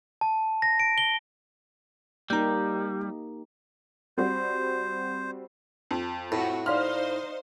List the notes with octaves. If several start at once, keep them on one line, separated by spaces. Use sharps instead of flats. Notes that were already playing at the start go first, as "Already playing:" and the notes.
A5
A#6
D7
G7
G3 A#3 D#4 G4 A#5 G6
G3 C4 F#4 C5
F2
A2 C4 F#4
D#4 C5 D5 F5 C6 F6